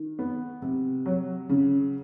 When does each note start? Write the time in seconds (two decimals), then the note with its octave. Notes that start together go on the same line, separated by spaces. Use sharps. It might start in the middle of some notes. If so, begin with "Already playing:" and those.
Already playing: D#3
0.19 B3
0.62 C3
1.06 F#3
1.49 C#3